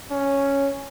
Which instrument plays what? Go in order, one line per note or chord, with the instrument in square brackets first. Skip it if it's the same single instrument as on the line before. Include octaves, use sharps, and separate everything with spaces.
[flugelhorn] C#4